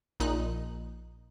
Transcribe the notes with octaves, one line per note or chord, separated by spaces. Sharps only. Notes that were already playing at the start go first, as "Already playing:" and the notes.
A#1 A#2 D#4 F#6